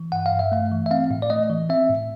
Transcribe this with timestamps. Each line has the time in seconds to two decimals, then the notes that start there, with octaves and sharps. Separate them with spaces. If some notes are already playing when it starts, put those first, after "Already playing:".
Already playing: E3
0.12 G2 F#5
0.26 F5
0.32 G2
0.39 E5
0.52 A3 F5
0.72 E3
0.86 E5
0.91 C4 F5
1.11 A2
1.22 D5
1.30 A3 D#5
1.50 E3
1.69 C4 E5
1.89 A2